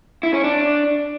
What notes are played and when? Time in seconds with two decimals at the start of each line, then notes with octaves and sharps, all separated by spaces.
0.23 E4
0.34 C#4
0.44 D4